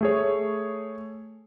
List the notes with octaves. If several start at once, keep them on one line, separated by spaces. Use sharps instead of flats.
A3 G#4 C#5